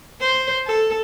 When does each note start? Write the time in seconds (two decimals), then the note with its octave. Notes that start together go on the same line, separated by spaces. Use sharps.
0.21 C5
0.66 A4